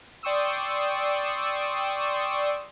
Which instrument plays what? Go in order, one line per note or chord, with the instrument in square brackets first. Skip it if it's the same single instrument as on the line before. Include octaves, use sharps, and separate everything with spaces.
[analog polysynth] D5 G5 C6 C#6 D#6 E6